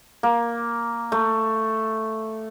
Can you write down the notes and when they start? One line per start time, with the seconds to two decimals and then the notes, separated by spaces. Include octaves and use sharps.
0.23 A#3
1.12 A3